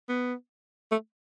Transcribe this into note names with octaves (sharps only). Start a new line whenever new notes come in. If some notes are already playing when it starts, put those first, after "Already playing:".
B3
A3